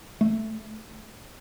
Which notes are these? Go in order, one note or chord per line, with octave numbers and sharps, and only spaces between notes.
A3